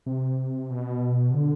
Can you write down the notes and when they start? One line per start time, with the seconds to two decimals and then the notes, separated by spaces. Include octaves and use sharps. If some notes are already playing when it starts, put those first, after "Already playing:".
0.06 C3
0.70 B2
1.30 C3
1.34 D3